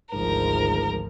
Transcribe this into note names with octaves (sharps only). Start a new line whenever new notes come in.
G#1 D2 G#2 F3 A#4